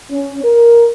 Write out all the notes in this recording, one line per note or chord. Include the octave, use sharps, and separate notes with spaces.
C#4
A#4